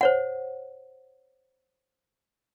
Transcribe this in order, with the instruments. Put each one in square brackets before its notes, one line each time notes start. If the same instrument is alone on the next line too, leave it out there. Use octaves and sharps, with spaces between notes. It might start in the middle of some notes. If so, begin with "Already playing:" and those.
[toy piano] C5 C#5 F#5